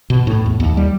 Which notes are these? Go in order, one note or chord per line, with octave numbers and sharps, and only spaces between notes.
B2
A2
E2
D#2
G3